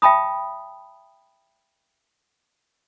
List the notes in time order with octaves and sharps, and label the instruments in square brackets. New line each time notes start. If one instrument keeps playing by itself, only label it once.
[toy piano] E5 G5 A5 B5 D#6